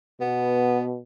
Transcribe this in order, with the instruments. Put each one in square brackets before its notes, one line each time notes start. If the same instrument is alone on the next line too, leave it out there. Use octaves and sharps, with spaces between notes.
[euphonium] B2 [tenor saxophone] B3